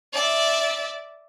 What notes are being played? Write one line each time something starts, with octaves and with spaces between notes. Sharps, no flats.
D5 E5